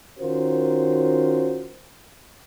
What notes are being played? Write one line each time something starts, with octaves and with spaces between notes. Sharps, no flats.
D#3 C#4 F4 F#4 A#4 C5